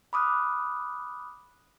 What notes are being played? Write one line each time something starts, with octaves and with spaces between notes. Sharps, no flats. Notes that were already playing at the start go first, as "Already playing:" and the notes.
B5 D6 D#6 F6 F#6